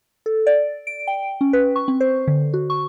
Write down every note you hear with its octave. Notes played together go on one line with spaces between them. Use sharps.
A4
D5
D7
G5
C#4
B4
C#6
C4
C5
D3
F#4
C#6